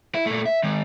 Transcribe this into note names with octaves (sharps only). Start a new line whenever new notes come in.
E4
A#2 A3
E5
D#3 G#3